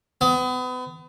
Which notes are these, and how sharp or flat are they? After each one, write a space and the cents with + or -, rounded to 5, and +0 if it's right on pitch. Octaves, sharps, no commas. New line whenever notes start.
B3 +35